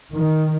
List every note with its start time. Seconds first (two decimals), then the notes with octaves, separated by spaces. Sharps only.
0.13 D#3